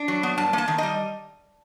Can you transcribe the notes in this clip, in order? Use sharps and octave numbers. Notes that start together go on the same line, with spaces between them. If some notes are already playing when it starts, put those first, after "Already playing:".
Already playing: D4
F#3
B3
G2 A5
A#3 A5
D#3
G3 D#5